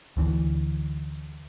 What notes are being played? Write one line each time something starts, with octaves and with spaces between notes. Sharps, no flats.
D2 D3 E3